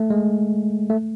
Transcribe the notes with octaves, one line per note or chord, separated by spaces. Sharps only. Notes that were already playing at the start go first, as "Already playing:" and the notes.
Already playing: A3
G#3
A3